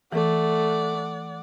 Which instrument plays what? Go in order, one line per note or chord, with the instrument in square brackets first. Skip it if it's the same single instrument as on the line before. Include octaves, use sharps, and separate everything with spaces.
[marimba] E3 [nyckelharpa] A3 [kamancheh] D5 F#5